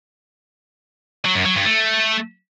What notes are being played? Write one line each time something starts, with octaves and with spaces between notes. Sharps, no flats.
F#3
F#2
F#3
G2
A3